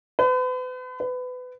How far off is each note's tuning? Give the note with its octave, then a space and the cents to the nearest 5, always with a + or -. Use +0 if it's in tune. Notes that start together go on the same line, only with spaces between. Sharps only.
B4 +40
B4 +25